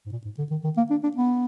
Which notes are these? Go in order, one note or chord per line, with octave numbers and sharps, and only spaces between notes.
G#2
A#2
G#2
D3
D#3
D#3
A#3
D4
D4
B3